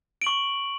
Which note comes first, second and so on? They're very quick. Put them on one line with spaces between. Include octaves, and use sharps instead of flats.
D7 F#7 C#6